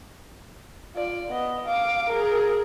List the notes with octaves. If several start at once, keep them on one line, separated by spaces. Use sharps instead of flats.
F4 D5
B3 D#5
F5 D6
G#4 A#4